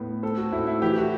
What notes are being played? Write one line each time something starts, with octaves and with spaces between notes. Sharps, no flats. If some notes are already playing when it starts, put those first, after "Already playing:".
Already playing: A2 B3
C4 A4
F#4
A2 E4
E4
E3 G4
F#4